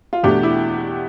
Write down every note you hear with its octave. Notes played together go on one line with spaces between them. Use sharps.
F4
E2 B2 A3 D4 G4
E4